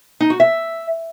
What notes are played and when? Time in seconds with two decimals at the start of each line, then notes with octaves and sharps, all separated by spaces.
0.20 D#4
0.30 F#4
0.40 E5